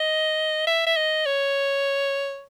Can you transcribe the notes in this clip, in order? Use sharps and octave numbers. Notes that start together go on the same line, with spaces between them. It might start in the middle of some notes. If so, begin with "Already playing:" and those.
Already playing: D#5
E5
E5
D#5
C#5